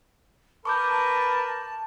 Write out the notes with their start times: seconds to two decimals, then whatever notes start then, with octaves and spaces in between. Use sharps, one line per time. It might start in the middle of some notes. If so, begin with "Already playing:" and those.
0.65 A#4 B4 A5 C#6 D6 G6